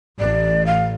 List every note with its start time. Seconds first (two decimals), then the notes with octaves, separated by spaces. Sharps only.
0.19 A1 D5
0.66 F5